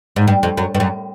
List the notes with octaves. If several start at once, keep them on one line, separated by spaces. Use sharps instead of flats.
G#2
G2
F2
F#2
G2
F#2